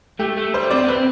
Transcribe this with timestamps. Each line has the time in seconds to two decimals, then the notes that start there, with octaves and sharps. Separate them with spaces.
0.20 A3 G4
0.37 A3
0.54 G3 C5
0.71 C4 D5
0.84 B3
0.88 C4 B4